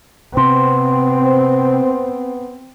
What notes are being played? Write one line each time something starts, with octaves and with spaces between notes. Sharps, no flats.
C3 B3 C4 C6